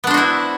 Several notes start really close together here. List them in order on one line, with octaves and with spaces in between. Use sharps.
B3 D4 C5 F#4 E4